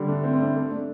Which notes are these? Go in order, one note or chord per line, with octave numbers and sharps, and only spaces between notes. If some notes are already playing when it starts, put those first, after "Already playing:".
Already playing: D3 G3
A3 D4
C4 E4
C4
A3 D4
A3 D4
A3 D4